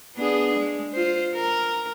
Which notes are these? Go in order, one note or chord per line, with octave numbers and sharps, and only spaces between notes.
B3 D4 G#4
G#3
F4 C5
A#4